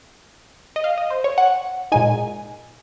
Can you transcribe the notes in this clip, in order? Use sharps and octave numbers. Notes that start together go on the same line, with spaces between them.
D#5
F5
D#5
C5
C#5
F#5
A#2 G#3 D#4 G#5